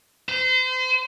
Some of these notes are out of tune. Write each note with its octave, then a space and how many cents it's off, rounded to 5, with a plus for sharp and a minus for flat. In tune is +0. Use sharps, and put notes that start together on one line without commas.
C5 -35